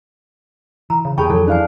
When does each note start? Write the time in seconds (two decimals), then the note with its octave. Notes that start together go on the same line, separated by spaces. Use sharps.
0.90 E3 A#5
1.05 C#3
1.18 E2 G4 G#4 G5 A5 B5 C#6
1.30 F2 E3 F#3 A4
1.48 D4 E4 C5 F5 G#5